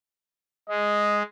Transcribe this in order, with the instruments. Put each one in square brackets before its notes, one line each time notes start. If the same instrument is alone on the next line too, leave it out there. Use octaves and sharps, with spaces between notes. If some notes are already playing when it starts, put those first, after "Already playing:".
[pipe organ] G#3 [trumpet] D#5